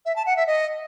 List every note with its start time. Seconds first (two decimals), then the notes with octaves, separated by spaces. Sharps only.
0.06 E5
0.16 A5
0.26 F#5
0.37 E5
0.47 D#5